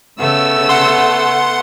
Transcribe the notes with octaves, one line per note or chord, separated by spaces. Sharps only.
C#3 A3 B3 E6
F#5 C6